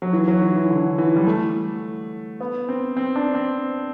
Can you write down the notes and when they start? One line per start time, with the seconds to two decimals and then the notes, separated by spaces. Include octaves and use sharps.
0.02 F#3
0.13 E3
0.28 F#3
0.42 E3
0.56 E3
0.70 D3
0.98 E3
1.16 G3
1.27 A3
2.41 B3
2.69 C4
2.97 C4
3.16 D4
3.35 C4